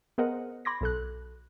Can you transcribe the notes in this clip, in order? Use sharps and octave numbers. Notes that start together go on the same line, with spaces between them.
B3 G#4 A#4 C5 D#5 F#5
B5 C6 D6 G#6 A#6
B1 A4 F#6